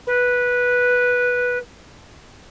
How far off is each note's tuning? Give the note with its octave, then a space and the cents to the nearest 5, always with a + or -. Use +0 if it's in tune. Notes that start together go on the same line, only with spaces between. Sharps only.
B4 -10